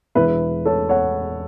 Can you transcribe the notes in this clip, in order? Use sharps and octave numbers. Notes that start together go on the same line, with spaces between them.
E1 E2 E3 B4 E5
A4 C#5
C#5 F#5